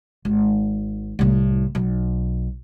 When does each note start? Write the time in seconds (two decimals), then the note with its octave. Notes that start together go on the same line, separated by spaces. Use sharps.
0.25 G#1
1.19 C2 A2
1.75 B1